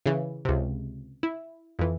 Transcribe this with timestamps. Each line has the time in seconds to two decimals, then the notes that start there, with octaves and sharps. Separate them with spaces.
0.06 C#3 E3
0.45 C#2 C3
1.23 E4
1.79 F2 E3